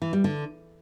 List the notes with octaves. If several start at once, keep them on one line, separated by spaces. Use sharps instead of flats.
E3
G3
D3